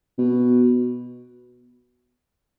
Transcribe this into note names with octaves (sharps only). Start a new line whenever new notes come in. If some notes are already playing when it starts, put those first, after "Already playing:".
B2